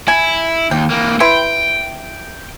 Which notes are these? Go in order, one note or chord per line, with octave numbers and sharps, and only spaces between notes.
E4 G#5
D#2 G5
E3 A#3
E4 B4 G5 C6